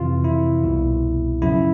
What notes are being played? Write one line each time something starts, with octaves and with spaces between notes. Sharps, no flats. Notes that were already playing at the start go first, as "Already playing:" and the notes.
Already playing: F2 C3 E3 F4
E4
C2 B2
F#2 C#3 F3 E4